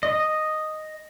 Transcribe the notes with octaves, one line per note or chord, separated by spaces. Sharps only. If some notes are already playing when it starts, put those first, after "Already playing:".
D#5